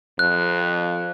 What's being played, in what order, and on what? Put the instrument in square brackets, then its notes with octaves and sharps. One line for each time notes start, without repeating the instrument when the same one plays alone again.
[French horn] F2 [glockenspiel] F#6